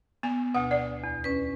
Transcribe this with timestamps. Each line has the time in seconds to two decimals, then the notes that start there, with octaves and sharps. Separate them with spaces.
0.23 B3 G#5
0.55 D2 B2 F#5
0.71 D5
1.04 E2
1.24 C#4 B4